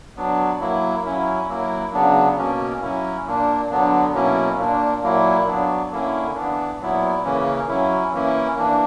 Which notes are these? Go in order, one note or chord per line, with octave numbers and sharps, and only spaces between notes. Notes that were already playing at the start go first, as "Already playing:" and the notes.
F#3 B3 D4
F#3 A#3 E4
F#3 C#4 E4
F#3 A#3 E4
C#3 F#3 B3 D4
B2 A#3 C#4
F#3 C#4 E4
A#2 A#3 D4
D3 F#3 B3 D4
B2 F#3 A#3 C#4 E4
A#2 A#3 D4
A#2 F#3 A#3 E4
F#3 B3 D4
D3 A#3 C#4 E4
E3 B3 D4
A#2 F#3 B3 E4
C#3 E3 A#3 C#4
F#3 C#4 E4
E3 A#3 C#4 E4
E3 A#3 D4